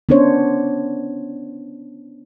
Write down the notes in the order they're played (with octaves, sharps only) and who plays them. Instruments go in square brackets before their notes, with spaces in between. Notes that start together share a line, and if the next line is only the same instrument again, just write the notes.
[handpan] B3 C#4 D4 C5 C#5